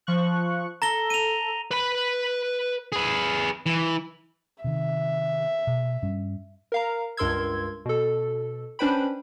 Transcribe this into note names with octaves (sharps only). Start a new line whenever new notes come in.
F3 C#6 F#6
A4 A#5 A#6 G7
D#7 F7
B4 B5
G#4 B4
E3
C3 D#3 E5
B2
G2 G3 C#4
A#4 F5 A#5
C#2 G2 A#4 C6 E6 G#6
B2 A4
C#4 D4 B4 C5 G5 B5